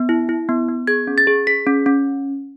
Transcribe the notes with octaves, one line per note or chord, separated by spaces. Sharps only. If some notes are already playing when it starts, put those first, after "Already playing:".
Already playing: B3
E4
E4
B3
B3
G#4 G#6
C#4
A6
G#4
G#4 B6
C#4
C#4